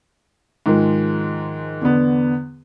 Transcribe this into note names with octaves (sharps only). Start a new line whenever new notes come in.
G#2 D#3 F3 G#3
E2 D3 B3